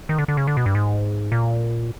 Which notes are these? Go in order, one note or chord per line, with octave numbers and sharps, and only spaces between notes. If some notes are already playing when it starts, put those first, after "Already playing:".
D#3
D3
D3
C#3
D3
B2
G2
G#2
A#2